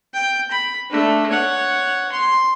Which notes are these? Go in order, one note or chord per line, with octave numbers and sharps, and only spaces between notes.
G5
B5
A3 D4
C#5 F#5
C6